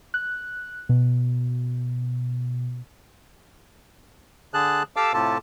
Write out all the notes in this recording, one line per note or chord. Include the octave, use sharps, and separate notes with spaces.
F#6
B2
D3 G#4 A5 F#6
G4 A4 F5 A5 D6 E6
A2 C3 F4 G4 A4 A5